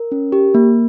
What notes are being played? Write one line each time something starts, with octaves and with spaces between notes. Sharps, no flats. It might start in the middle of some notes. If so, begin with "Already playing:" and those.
Already playing: A#4
C#4
G4
A#3